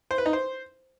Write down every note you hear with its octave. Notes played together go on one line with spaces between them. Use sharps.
C5
B4
D#4
C5